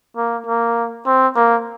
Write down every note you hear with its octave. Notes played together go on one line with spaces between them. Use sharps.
A#3
A#3
C4
A#3